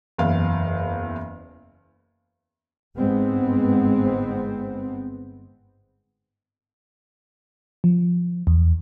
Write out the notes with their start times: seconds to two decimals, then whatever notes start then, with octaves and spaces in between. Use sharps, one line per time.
0.18 F#1 E2 F5
2.97 G1 G#2 G#3 B3 C4
7.84 F3
8.47 E2